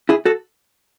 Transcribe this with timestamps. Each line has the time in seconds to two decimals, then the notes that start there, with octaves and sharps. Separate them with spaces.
0.09 E4 G#4
0.25 F#4 A4